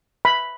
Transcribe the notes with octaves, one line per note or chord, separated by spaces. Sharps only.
B5